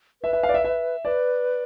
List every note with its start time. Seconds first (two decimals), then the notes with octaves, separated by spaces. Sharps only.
0.22 B4 E5
0.33 E5
0.43 F5
0.49 D5
0.54 E5
0.64 E5
1.05 B4 D5